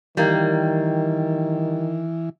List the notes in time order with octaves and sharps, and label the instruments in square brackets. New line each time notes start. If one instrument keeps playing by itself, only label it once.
[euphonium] D#3 [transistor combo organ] E3 [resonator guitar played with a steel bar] G3 A#3